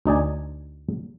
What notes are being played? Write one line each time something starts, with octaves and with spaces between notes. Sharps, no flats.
D2 D#4 D5 G#5